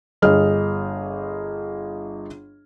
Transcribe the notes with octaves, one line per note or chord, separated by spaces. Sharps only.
G1 G#4 D#5 F6